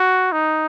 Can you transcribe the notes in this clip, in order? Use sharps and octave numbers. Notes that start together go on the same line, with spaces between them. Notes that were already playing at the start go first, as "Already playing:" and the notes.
Already playing: F#4
D#4